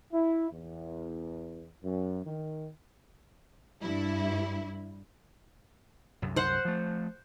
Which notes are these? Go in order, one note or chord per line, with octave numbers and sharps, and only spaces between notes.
E4
E2
F#2
D#3
G2 E4
C2 F#2
C5 F#5
F3 A3